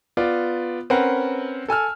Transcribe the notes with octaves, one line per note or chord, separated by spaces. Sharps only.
B3 F4 D5
C4 C#4 A#4 B4 F#5
A4 G#5 E6 F6